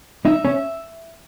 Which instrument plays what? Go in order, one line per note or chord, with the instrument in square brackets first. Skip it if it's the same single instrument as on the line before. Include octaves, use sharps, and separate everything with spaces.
[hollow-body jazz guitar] D#4 [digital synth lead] E5
[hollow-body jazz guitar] C#4